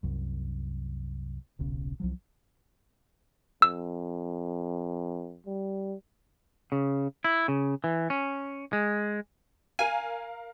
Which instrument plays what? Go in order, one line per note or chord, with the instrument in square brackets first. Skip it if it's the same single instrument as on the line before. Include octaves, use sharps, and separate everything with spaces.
[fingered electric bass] C2 F#2
D#1 B1 C#3
C2 F3 F#3
[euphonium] F2 [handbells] E6
[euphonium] G3
[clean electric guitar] C#3
E4
C#3
E3
C#4
G#3
[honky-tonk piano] A#4 F5 [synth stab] G#5